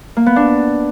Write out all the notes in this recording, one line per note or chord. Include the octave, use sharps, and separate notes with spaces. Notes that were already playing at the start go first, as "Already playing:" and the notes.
A#3
B3
D4